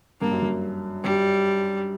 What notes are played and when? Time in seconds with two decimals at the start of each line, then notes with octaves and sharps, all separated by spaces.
0.21 G2 A#3
0.31 F#2
0.42 G2
1.04 G2 G3